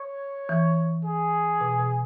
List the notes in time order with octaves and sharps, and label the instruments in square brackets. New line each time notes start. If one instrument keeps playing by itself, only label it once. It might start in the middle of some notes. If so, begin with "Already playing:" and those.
Already playing: [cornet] C#5
[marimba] E3
[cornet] G#4
[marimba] B2
B2